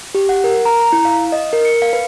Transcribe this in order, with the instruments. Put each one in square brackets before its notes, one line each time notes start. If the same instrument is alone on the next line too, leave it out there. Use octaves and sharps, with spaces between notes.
[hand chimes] G4
F#5
A#4
A#5
A#5
E4
F5
D#5
A#4
C#7
F5
B4